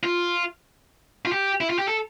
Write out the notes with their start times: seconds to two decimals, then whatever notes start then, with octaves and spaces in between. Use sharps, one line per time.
0.04 F4
1.25 F4
1.32 G4
1.61 E4
1.70 F4
1.79 G4
1.88 A4